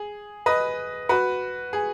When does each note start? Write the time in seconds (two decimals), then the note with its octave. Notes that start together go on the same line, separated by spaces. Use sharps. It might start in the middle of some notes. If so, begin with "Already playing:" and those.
Already playing: G#4
0.46 B4 D#5
1.09 F#4 B4
1.73 G#4